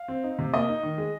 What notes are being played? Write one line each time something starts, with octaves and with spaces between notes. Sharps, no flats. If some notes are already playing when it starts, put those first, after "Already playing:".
Already playing: F5
C4
D#4
C3
A#3 D#5
D#4
D#3
G#3